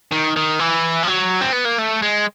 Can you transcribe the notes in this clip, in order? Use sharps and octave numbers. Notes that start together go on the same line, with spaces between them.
D#3
D#3
E3
F3
F#3
C4
B3
A#3
A3
G#3